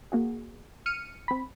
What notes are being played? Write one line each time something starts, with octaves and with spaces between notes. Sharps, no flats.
A#3 F#4 G#4
F6 C#7 D#7
C4 B5